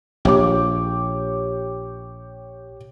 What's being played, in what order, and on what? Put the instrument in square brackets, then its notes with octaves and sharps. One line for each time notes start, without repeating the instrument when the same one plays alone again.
[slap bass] A#1 [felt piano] G4 C#5 D6